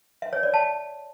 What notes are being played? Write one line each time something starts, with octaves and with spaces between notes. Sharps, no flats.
E5
C#5
D5
A5